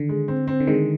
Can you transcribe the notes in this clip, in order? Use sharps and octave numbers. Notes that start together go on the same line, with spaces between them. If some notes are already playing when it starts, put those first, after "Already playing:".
Already playing: D3 D#3
G#3
C4
C4
D3
D#3 G#3